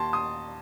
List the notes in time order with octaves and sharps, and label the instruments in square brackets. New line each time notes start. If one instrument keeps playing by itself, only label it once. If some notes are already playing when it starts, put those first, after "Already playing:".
Already playing: [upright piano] D#2 A5 C6
C6 D#6